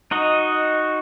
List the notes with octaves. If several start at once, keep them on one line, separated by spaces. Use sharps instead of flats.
D#4 F#4 D#5